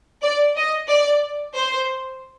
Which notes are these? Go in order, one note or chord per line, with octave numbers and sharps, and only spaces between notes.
D5
D#5
D5
C5